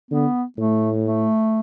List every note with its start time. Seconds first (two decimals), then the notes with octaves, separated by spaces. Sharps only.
0.11 D3 B3
0.58 A2 A3
1.05 A3